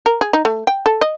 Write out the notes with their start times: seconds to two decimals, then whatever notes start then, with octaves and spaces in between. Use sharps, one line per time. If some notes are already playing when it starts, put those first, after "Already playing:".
0.06 A#4
0.21 G#4
0.33 D#4
0.45 A3
0.67 G5
0.86 A4
1.01 D#5